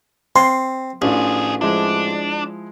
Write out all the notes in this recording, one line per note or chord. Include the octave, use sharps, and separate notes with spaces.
C4 C6
A1 A2 F3 D4 F4 G#4
F3 G#3 D4 E4